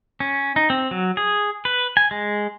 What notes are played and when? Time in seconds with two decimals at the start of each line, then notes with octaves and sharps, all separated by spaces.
0.20 C#4
0.56 D#4
0.70 C4
0.91 F#3
1.17 G#4
1.65 B4
1.97 G#5
2.11 G#3